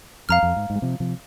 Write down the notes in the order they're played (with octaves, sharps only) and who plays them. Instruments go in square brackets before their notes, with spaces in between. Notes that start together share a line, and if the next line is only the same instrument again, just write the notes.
[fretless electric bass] F2 [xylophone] F5 A#5 F6
[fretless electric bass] F2
G#2
G#2
G#3
C3 F3
C3 F3